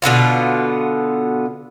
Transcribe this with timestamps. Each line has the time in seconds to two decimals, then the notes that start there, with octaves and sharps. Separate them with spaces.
0.02 B2 D3 B3 F4